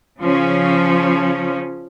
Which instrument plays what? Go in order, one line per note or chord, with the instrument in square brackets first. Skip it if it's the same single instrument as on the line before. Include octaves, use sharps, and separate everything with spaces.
[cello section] C#3 F3 C#4